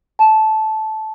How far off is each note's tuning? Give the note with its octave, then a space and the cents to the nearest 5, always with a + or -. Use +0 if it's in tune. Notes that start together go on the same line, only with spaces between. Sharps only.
A5 -15